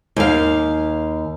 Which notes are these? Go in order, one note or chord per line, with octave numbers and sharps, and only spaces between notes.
D#2 F5